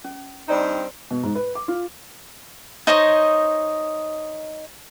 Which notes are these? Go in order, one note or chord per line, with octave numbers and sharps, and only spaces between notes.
C#4
G2 C4 D#4 D5 A#5
B2
G#2
B4
D6
F4
D#4 C5 C#5 D#5